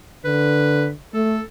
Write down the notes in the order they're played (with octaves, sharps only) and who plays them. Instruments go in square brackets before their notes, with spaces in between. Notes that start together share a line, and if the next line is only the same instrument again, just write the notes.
[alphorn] D3 [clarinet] B4
[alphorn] A3 [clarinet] A4